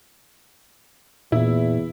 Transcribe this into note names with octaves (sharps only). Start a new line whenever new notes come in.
E2 A#2 E4